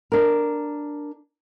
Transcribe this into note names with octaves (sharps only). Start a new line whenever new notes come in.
D4 A#4